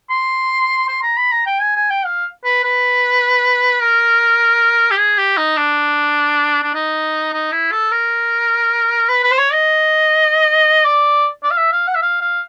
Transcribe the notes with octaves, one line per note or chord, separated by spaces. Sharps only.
C6
C6
A#5
B5
A#5
G5
G#5
G#5
G5
F5
B4
B4
A#4
G4
G#4
G4
D#4
D4
D4
D#4
D#4
E4
A4
A#4
B4
B4
C5
C#5
D#5
D5
D5
F5
E5
F5
F#5
E5
F5
F5